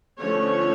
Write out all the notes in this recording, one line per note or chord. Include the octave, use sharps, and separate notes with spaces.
D3 F3 A3 C#4 C#5